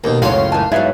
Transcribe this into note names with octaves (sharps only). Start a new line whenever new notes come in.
D#2 B2 A#3 D#4 A4
C#2 F#2 A2 F4 F#4 C#5 C6
C#4
E3 D#4 A#4 A5
G#2 F#3 B3 E4 D5 E5 F5